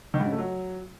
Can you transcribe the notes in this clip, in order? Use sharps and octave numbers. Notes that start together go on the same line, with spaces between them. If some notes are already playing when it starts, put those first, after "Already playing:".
D#3
G#2
C#3
A3
F#3